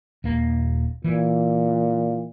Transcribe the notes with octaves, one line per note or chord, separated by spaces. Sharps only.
D#1 A#3
A#2 E3